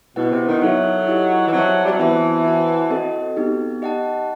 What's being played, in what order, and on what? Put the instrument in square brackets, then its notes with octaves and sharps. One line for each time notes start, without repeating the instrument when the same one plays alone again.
[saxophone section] B2 [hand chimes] B3 E4 B4 F#5
[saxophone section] C3
D#3
[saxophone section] F#3 [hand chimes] D#4 A4 E5
[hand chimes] E4 G4 D#5
[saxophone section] E3
[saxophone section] F#3 [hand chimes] C4 F#4 C5 E5 A5
[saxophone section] G3
F#3
[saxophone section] E3 [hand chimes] B3 F#4 C5 E5 A5
[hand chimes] F#4 C5 F#5 A5
C4 F#4 A4 D#5
B3 D#4 G4
G4 D#5 F#5 A5